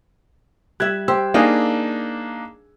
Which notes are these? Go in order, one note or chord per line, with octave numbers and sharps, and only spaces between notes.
G3 E5 F#6 G#6
G4 C5 E6
A#3 D4 D#4 G#4 D#5 F5